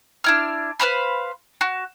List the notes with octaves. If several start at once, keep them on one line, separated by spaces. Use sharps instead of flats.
D4 E4 F6
B4 C5 F5 B5
F#4